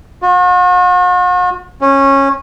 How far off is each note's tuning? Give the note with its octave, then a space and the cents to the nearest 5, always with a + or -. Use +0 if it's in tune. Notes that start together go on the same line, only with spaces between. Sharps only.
F#4 -45
C#4 -15